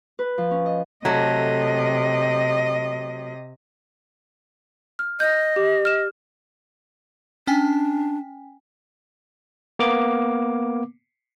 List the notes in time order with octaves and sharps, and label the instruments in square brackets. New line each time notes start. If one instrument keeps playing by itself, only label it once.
[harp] B4
F3
C#4
D#5
[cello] C3 D#5 [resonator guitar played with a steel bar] F#3 A3
[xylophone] F6
[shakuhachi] D#5 [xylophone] G6
[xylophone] G4
F6 E7
[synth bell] C#4 G5 G#5 [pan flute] D4
[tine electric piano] A#3 B3 D6